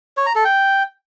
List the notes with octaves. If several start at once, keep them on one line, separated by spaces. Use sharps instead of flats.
C#5
A#5
A4
G5